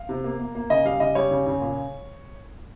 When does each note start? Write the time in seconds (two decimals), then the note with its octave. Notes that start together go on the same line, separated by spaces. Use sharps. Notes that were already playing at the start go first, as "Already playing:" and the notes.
Already playing: F5
0.09 C3
0.24 A#3
0.40 A#3
0.55 A#3
0.70 C#3 D#5
0.85 G3 F5
1.00 C#3 D#5
1.15 G3 C#5
1.31 C#3
1.47 C#3
1.61 A#2